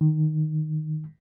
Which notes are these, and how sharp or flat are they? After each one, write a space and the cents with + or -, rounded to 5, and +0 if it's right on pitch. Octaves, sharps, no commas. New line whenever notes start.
D#3 -10